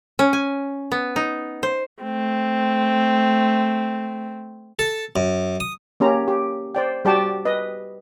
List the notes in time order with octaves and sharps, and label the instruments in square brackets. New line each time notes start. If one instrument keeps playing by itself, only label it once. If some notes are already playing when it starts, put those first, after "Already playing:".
[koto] C#4
G#5
B3
D#4
C5
[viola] A3 C4
[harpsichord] A4
F#2
D#6
[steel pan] A#3 C#4 G4 A#5
G4
C5 D5 G5
G3 F#4 G4 D5 G5 A5
B4 D#5